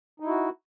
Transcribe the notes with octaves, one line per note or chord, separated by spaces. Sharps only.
D#4 E4 F#4